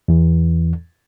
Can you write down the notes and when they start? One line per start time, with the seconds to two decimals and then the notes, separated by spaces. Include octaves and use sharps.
0.08 E2 E3